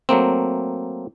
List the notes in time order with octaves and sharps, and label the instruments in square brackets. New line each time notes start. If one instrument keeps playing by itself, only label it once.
[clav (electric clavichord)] F#3 A3 A#3 C4